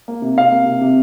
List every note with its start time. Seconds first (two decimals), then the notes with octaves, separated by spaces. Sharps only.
0.08 A#3
0.22 C3
0.38 C3 F5
0.51 A#3
0.66 C3
0.81 C3